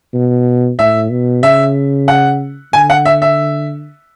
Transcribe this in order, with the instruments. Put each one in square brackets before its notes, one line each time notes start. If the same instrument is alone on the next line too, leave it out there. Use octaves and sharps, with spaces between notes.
[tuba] B2
[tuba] A2 [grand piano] E5
[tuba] B2
[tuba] C#3 [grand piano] E5
[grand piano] F#5
[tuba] D3 [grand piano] G#5
[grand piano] F#5
E5
E5